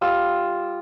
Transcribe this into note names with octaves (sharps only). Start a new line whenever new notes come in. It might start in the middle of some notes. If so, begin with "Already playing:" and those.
G3 F4 E6